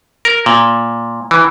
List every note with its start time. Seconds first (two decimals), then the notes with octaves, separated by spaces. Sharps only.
0.25 A#4
0.46 A#2
1.31 E3